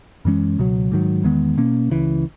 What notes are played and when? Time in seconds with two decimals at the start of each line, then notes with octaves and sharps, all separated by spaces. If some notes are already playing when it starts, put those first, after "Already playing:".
0.25 F#2 E3 G#3 C#4
0.59 C#2 B2 F#3
0.92 G#2 D#3 F#3
1.24 E2 D#3 G#3 B3
1.57 B2 A#3 C#4
1.90 C#2 C#3 E3